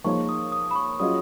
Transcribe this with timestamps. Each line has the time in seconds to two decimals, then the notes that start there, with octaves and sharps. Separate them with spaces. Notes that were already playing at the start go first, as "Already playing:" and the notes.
0.04 F3 A#3 D#4 G#4 C#5 C#6
0.29 D#6
0.52 D#6
0.71 B5
0.76 C#6
1.00 F#3 C#4 F4 G#4 D#5 D#6